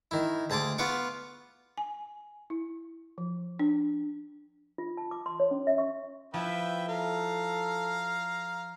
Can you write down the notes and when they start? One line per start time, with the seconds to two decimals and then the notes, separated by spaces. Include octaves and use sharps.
0.11 D#3 E4
0.50 D2 G#4 A5 C6 D6
0.78 B3 F4 F5 F#5 C#6 D6
1.78 G#5
2.50 E4
3.18 F3
3.59 D4
4.78 F4
4.97 A5
5.11 D6
5.26 C6
5.40 C#5
5.51 C#4
5.67 E5
5.78 C#6
6.34 F3 E4 B4 E5 G5
6.88 A4 F5 A#5